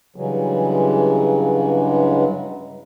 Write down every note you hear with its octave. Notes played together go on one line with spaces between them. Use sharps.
G2 C#3 E3 F#3 G#3